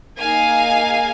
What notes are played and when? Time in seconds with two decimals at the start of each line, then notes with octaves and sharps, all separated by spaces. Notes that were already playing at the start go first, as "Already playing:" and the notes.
0.19 A#3 D#4 G#4 F5 G#5